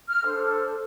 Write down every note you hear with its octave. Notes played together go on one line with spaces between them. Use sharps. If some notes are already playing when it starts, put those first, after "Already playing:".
F6
D4 A4 C5